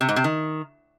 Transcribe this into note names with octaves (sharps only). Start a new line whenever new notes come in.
C3
G#2
C3
D#3